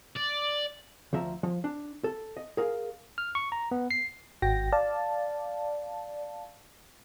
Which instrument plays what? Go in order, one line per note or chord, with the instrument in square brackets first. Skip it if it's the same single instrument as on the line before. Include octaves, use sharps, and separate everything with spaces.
[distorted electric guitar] D5
[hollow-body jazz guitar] D2 F3 E5 A#5
F3
D4
A4
D#5
G#4 A#4 F5
[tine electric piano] F6
C#6
A#5
B3
C7
[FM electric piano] G#1 F#4 G5 A#6
D5 F5 A5